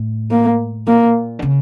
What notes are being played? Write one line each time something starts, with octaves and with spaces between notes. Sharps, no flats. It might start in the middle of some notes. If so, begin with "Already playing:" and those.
Already playing: A2
A#3
A#2 A#3
D3
C#3